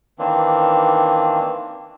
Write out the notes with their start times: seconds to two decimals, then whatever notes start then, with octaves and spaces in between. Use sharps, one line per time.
0.19 D#3 E3 A#3 C4 D4